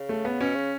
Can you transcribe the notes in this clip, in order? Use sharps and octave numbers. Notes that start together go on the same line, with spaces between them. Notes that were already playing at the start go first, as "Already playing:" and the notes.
Already playing: C#3
A3
B3
B2 C#4
C#3